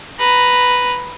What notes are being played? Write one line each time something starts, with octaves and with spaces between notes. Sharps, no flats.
B4 A#5